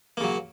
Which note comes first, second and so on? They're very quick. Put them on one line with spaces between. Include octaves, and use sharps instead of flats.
A#3 C#3 F#3